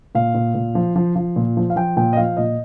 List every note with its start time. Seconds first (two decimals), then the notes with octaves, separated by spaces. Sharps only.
0.15 A#2 F5
0.35 A#2
0.55 A#2
0.75 F3
0.96 F3
1.16 F3
1.36 A#2
1.57 F3
1.70 F5
1.76 F3 G5
1.97 A#2 G5
2.13 D#5
2.17 F3 F5
2.37 A#2 D#5